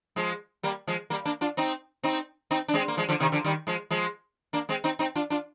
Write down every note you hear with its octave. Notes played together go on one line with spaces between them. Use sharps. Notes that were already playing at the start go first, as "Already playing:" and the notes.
F3 G#3
G3 A#3
F3 G#3
G3 A#3
A#3 D4
D4 F4
C4 D#4
C4 D#4
C4 D#4
D4
G#3 C4
A#3
F3 G#3
D3 F3
C3 D#3
D3 F3
D#3 G3
F3 G#3
F3 G#3
A#3 D4
G#3 C4
C4 D#4
C4 D#4
D4 F4
D4 F4